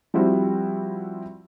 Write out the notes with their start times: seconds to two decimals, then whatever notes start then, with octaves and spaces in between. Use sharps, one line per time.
0.14 F3 G3 C4 E4 F#4